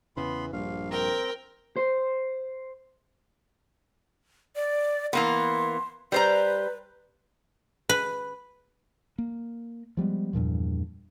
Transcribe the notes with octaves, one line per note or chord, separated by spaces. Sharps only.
E2 C#3 E3 B3 B5 C6
A#1 G2 G3 F5
C4 A#4 G5 A#5
C5
D5
E3 A#3 B3 C6
G3 B4 C5 A#5
B4
A#3
F3 G3 G#3 B3
E2 G2 A#2 F3